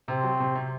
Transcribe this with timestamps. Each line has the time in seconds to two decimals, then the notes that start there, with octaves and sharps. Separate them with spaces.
0.08 C3 C4
0.23 F#3
0.40 C3
0.55 C3